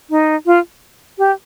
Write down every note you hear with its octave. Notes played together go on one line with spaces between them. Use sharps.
D#4
F4
G4